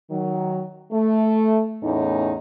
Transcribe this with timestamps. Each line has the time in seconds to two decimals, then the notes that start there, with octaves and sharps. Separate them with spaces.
0.10 D#3 F#3
0.91 A3
1.83 E2 A2 C#4 D#4